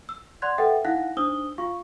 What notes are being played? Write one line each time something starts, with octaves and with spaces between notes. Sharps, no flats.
E6
D5 F#5 C6 F#6 G#6
A4 B4 E5 F#5 G5
D#4 E4 F5 F#5 F#6 A#6
D4 D#4 C5 D#6 E6 G7
F4 F5 C#6